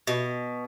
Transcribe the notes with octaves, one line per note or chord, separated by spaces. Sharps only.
B2